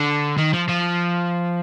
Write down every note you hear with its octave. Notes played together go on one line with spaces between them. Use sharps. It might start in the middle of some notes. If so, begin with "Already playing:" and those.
Already playing: D3
D#3
F3
F3